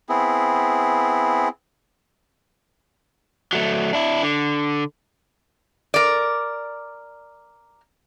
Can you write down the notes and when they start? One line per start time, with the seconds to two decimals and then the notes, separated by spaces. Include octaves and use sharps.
0.09 B3 C4 E4 G#4
3.53 F#3 A3
3.93 D4 E4
4.23 D3
5.94 A#4 D5